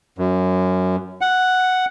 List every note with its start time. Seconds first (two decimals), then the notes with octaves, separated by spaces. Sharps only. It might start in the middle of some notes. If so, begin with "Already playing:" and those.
0.18 F#2
1.21 F#5